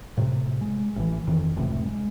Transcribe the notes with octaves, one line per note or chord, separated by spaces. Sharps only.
A2 C3
G#3
A1 E3
F2 D#3 E3
F1 C#2 A2 C3
G#3